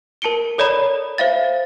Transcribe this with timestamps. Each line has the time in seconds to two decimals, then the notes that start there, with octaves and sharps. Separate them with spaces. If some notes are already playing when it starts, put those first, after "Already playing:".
0.22 A#4 A5 C#7 D7 G7
0.58 A4 C#5 D5 A#5 B5
1.18 C5 E5 F5 A6